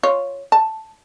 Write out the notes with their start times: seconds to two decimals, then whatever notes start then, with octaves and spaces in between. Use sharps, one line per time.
0.03 F4 C#5
0.52 A5